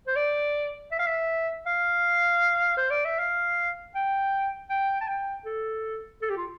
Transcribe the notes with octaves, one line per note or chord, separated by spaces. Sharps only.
C5
D5
E5
F5
E5
F5
C5
D5
E5
F5
G5
G5
A5
G5
A4
A4
G4
F4